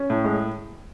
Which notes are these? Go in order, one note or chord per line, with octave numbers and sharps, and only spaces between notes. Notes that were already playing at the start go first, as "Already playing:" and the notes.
Already playing: C#4
A2
G#3